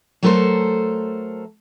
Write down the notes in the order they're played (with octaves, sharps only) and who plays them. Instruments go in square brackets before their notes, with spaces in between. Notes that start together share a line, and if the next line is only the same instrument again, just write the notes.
[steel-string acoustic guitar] F#3 A3 A4 A#4 C5